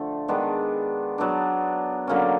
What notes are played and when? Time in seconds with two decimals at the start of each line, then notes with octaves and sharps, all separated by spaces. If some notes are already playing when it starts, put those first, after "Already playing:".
Already playing: D3 F3 A3
0.28 D#3 G#3 B3 D4
1.18 F#3 B3 D4
2.07 D3 F#3 A#3 C#4